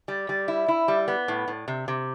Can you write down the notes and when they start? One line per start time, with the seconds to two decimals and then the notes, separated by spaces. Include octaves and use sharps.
0.08 G3
0.29 G3
0.48 E4
0.68 E4
0.88 G3
1.08 B3
1.28 A2
1.48 A2
1.68 C3
1.88 C3